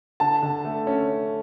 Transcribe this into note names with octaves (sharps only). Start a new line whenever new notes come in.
D3 A5
D3
A3
C#4